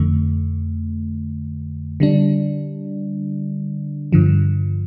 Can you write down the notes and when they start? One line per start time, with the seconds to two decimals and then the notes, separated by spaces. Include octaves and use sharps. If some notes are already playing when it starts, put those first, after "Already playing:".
Already playing: F2 D3 A3
2.00 D3 G3 D4
4.12 G2 D3 F3